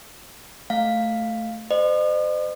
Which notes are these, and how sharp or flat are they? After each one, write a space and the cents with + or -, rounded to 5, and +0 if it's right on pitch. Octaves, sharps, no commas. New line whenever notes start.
A3 +0 F5 +0
C5 -30 D#5 -45